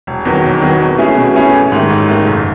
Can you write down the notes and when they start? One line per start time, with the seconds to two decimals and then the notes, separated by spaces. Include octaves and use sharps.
0.07 E1
0.25 E2 D#3 F#3
0.43 E1
0.62 E2 D#3 F#3
0.80 B2
0.98 A3 C#4 E4 G#4
1.17 B2
1.35 A3 C#4 E4 G#4
1.53 A1
1.72 G#2 D#3 A3
1.90 A1
2.08 G#2 D#3 A3
2.27 F#1